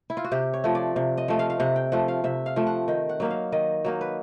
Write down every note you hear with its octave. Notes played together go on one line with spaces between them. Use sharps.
E4
F4
F#4
C3 G4
C#5
F3 A3
D5
C3
D#5
F3 A3
F5
F5
C3 F#5
G5
F3 A3 F#5
F5
C3 E5
F5
F3 A3
F#5
D#3 G5
F#5
F#3 A#3 D#4 E5
F5
D#3 D#5
F#3 A#3 D#4
B4